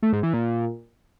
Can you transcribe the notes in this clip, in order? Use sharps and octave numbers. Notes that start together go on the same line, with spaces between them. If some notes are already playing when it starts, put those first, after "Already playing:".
A3
G#2
E3
A#2